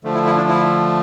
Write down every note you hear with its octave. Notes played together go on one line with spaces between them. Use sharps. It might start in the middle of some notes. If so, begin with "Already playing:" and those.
D3 F3 A3
E4
E4
D4
E4